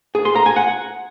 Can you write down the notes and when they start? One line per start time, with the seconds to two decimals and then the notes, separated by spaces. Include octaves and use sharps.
0.15 G#4
0.25 C6
0.36 A#5
0.46 G#5
0.56 F#5